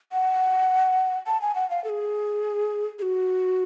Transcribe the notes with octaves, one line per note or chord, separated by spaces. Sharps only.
F#5
A5
G#5
F#5
F5
A4
G#4
G#4
F#4